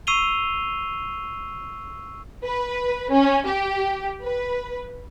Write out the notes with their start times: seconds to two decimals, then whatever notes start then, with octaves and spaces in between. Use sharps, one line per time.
0.07 C#6 E6 C7 D#7 F7 G7
2.44 B4
3.12 C#4
3.46 G4
4.25 B4